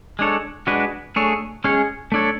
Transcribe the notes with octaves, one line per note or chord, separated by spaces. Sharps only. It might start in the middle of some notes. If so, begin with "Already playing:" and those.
G#3 D4 A4 C#5
G#3 D4 F#4 B4
A3 D4 G#4 C#5
G#3 C#4 G#4 C#5
A3 D4 A4 C#5